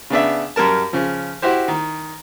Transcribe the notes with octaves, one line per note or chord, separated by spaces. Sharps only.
C#3 B3 D4 E5
F#2 G3 A#4 A5
C#3 F3
E4 F#4 G4 C5
D#3